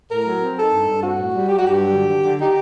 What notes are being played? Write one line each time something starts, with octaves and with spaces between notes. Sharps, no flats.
A2 A#4
F#3
C4
D#4 A4
G2
G2
C4 F#4
A2
G3
F#3 G4
F#4
G2 G4
F#3
D3
D3
D3
D#4 G4